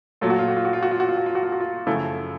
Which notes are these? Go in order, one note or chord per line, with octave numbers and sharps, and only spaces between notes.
A#2 F#3 A3 F4
F#4
F4
F#4
F4
F#4
F4
F#4
F4
F#4
F4
F#4
F4
F#4
F4
F#4
F4
F#2 C#3 F3 A3 E4